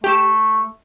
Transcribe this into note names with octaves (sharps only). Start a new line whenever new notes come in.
A3 G4 E7